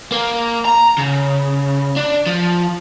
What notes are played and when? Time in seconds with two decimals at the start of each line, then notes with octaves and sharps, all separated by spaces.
0.12 A#3
0.65 A#5
0.98 C#3
1.97 D4
2.27 F3